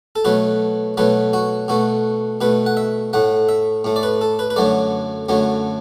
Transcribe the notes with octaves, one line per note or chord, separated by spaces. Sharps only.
A4
B2 F#3 A3 B4
B2 F#3 A3 B4
F#4
B2 A3 F#4
B2 A3 B4
F#5
E5
A2 A3 F#5
E5
A2 A3
D5
B4
A4
B4
B4
F#2 D3 F#3 A3 D5
F#2 D3 F#3 A3